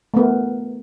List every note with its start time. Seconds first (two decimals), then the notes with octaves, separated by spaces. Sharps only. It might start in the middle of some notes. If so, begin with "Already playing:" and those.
0.14 A3
0.16 B3
0.19 A#4